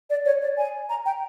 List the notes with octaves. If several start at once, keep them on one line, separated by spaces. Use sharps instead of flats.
D5
C#5
D5
G#5
A#5
G5